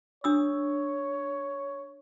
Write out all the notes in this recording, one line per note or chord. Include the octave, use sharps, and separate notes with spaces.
D4 C#5 D#6 E6